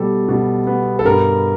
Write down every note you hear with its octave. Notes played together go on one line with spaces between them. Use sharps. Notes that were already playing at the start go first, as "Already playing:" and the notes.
Already playing: B2 G3 A4
B2
B3
A4
G2 A#4